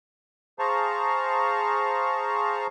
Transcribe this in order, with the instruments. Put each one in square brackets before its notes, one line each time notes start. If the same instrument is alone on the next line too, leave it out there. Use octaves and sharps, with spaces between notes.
[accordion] G#4 C5 F5 A5 A#5 C#6